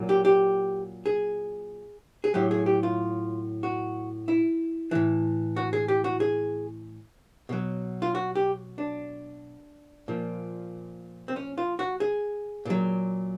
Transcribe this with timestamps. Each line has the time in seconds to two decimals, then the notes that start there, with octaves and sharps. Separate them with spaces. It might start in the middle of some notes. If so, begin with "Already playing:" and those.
Already playing: A#2 F#3
0.09 G4
0.25 G4
1.06 G#4
2.24 G#4
2.34 A2 F#3 G4
2.51 G#4
2.66 G4
2.83 F4
3.63 F#4
4.28 E4
4.91 A2 E3
5.56 F#4
5.73 G#4
5.88 G4
6.04 F#4
6.20 G#4
7.49 B2 F#3
8.02 F4
8.15 F#4
8.35 G4
8.78 D4
10.08 A#2 F3
11.28 C4
11.36 C#4
11.58 F4
11.79 F#4
12.00 G#4
12.65 A#2 F#3